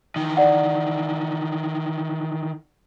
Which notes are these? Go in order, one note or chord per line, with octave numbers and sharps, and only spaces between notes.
D#3 E3
D5 F#5